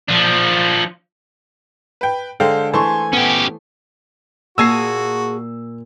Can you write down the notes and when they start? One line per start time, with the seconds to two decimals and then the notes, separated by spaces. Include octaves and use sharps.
0.08 F3 D4
2.01 B4 G5
2.40 D3 G#3 A4 C5 F5 G5
2.73 E3 A3 C5 G#5 A5 C6 C#6
3.13 B3 C#4 G4
4.58 A#2 F#4 G#4 A5 A#5 E6 C7